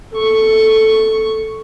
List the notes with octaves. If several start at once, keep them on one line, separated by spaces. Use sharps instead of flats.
A4 C#6